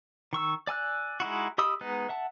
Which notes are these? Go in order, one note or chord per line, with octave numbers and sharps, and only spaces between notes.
D#3 C#6 E6
D5 G#5 E6 F#6
G#3 D#4 E4 F#4
G4 D#5 B5 D#6 E6
G#3 B3 D#4 B4
E5 F#5 A5